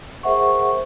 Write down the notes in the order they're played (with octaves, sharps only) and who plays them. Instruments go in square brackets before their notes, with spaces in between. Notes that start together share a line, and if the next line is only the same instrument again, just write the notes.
[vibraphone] G#4 A#4 C5 E5 F#5 C#6